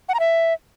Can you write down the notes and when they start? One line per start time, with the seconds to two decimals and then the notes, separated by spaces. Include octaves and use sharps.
0.09 F#5
0.14 A#5
0.20 E5